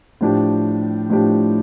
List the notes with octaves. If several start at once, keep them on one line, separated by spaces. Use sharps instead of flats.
A2 F3 D4 G4
A2 F3 D4 G4